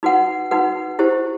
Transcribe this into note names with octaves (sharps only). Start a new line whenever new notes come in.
D#4 F#4 B4 F#5
D#4 F#4 B4 F#5
E4 G4 C5